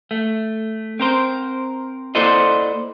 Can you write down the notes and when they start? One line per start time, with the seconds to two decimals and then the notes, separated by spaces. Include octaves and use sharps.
0.11 A3
1.00 C4 A#4 C5
2.15 A#3 E4 A4 C5 D5 D#5